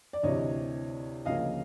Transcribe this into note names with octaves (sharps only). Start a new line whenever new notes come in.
D5
D2 C3 E3 C#5 D#5
D2 C#3 F3 A#3 C#4 D#5 F5